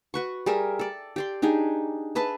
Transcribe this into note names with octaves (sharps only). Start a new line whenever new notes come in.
F#4 B4 C#6
G3 G#4 A#4 E5
A4 D5
G4 D5 C6
D4 D#4 G4 G#4
G#4 B4 E5 A5